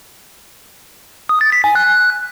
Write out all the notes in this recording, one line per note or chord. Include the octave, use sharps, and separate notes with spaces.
D#6
A6
B6
G#5
F#6